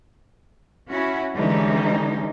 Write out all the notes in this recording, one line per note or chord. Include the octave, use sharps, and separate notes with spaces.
C#4 E4 F#4
D3 E3 G3 G#3 C#4 D#4